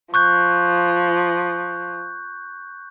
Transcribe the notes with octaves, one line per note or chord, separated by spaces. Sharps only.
F3 C#6 F#6 G6